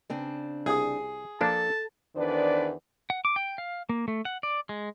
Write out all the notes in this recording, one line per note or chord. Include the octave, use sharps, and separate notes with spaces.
C#3 C4 D4
C2 G#4 D#6
F3 A#3 D4 A4 A5
E2 D#3 D4 B4 C5 D5
F#5
D6
G5
F5
A#3
A3
F#5
D5
G#3